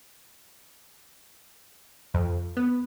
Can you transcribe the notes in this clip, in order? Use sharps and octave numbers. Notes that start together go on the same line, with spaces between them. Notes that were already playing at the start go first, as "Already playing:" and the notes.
F2
B3